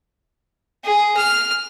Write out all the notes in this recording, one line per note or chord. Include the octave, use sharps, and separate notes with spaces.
G#4
F6